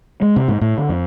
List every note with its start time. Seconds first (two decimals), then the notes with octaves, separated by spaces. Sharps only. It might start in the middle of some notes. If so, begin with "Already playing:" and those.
0.22 G#3
0.36 C3
0.48 G#2
0.61 A2
0.78 D3
0.89 F2